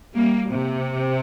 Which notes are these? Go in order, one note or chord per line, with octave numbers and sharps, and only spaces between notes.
G3 A#3
C3